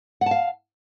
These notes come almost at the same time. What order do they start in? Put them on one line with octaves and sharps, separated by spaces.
F#5 A5 F5